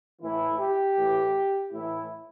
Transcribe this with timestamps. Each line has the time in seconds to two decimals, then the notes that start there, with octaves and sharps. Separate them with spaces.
0.22 A2 E3 E4
0.59 G4
0.97 A2 E3
1.72 A2 E3 E4